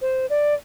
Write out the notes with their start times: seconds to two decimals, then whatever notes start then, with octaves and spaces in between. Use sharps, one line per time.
0.01 C5
0.29 D5